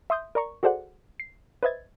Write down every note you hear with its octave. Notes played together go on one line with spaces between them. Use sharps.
E5 C6 D#6 G6
A#4 D5 A#5 C#6
F#4 G#4 A4 C5 D5 F#5
C7
B4 C5 D#5 E5 G#6 A6